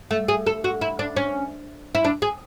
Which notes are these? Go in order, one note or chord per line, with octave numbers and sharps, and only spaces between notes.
A3
G#4
A4
F#4
E4
D4
C#4
E4
D4
G#4